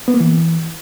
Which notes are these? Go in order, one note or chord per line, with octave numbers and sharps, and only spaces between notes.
B3
A#3
E3